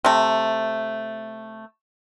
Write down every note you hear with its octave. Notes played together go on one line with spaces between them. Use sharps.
C3 A3